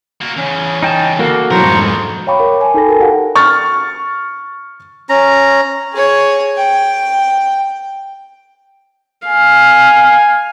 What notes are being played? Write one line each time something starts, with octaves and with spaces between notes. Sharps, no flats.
A#3 F#4
E2 C#3 C#4
D#4 G5 A5
A#3 F#4 A4
D#2 B2 E3 F#3 A#4 C5 A#5 C#6
F2 G#2 D#3 E3
C#5 F5 G5 B5 C#6 D6
A#4 G5
G#5 A5
D#4 A4 A#6
F#4 A#4 G5 G#5
F#4 G4 A#4 F5 F#5
C#6 F6 A6
C#4 A#5
G#4 C#5
G5
F5 G#5